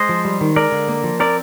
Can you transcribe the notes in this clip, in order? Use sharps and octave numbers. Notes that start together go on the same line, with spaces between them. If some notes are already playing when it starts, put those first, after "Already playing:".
Already playing: G#3 C5 D#5
F3
G3
D#3
G#3 A#4 D5
D3
A#3
F3
C4 A#4 D5